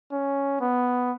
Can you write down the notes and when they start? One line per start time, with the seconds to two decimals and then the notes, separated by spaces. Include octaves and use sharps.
0.12 C#4
0.61 B3